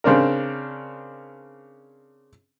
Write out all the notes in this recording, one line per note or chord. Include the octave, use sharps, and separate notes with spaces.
C#3 C4 D4 A#4